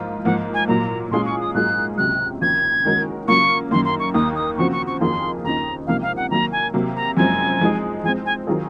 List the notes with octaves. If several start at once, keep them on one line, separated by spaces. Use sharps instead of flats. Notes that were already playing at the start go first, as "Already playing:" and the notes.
Already playing: G#2 F3 A#3 F4
G#2 F3 A#3 F#5
G#5
A#2 F#3 A#3 A#5
A#2 G#3 C#4 F4 G#4 C6
C#6
D#6
G#2 F#3 A#3 F4 G#4 F#6
C#2 C3 F#3 F#6
D#2 C#3 F3 A#3 G#6
D#3 G#3 C#4 F#4 A#4
C#3 F#3 A#3 F4 C#6
F#2 D#3 A#3 C6
C6
C#6
D#2 D#3 A#3 D#6
D#6
C#3 F3 C4 F#4 C#6
C#6
C#6
F2 D#3 A#3 F4 G#4 C6
D#2 C#3 F3 C4 D#4 A#5
C#2 C3 F3 A#3 D#4 F5
F5
F#5
D#3 F#3 A#3 A#5
G#5
C3 F#3 A#3
A#5
F#2 F3 G#3 C4 G#5
F3 G#3 D#4 G#4
F3 G#3 C4 G#5
G#5
D#3 F#3 C4 F4 G#4